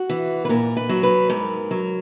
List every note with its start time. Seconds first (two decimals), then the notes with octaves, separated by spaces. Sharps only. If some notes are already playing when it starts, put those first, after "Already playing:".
Already playing: F#4
0.09 E3
0.45 B4
0.49 A#2 A#4
0.77 B4
0.89 F#3
1.03 B4
1.29 G#2 A#4
1.71 F#3